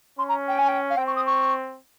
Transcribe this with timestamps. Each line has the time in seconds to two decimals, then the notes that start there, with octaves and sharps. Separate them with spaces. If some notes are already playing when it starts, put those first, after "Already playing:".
0.19 C#4 C6
0.29 A#5
0.48 G5
0.58 G#5
0.68 G5
0.90 F5
0.97 C4 G5
1.07 C#6
1.16 D#6
1.27 C#6